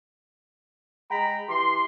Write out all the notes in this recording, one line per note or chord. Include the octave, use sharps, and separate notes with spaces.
G#3 G5 A#5 B5
E3 G4 C6